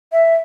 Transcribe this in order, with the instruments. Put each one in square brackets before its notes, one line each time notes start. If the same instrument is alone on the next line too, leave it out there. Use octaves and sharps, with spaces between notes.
[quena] E5